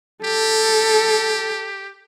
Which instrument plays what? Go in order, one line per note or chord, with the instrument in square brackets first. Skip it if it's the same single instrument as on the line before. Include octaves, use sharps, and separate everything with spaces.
[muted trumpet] G4 [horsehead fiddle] A4